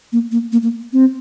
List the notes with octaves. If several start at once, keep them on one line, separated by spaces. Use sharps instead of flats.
A#3
A#3
A#3
A#3
C4